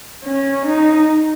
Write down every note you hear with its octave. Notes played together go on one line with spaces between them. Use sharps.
C#4
D#4